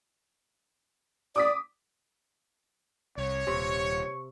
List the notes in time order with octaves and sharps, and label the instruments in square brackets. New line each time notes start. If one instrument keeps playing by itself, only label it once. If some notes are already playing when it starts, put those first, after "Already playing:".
[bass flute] D5 [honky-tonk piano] D6 D#6 B6
[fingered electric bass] C2 [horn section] C#5
[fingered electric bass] D#1 [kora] C3 [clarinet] C#6